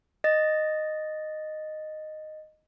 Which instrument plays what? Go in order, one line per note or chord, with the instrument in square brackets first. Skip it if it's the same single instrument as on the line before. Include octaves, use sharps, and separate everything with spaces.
[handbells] D#5 A6